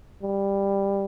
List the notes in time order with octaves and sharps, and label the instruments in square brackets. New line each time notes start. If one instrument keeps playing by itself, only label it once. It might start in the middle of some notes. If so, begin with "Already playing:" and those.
[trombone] G3